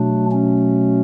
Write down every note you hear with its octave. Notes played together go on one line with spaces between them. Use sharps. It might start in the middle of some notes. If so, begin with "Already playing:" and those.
Already playing: B2 F#3 A3 D4
C#4